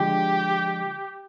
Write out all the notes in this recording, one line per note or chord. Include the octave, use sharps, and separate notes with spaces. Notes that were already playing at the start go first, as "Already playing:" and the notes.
Already playing: D3 F3 G#3 D4 G4